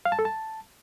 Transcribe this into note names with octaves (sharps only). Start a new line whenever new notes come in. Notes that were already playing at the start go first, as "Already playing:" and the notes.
F5
A5
A4
A5